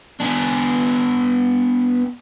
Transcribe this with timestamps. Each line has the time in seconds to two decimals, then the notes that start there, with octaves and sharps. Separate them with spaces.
0.20 B3 D4